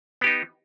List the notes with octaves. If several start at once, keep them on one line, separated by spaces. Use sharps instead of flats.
B3 D#4 G4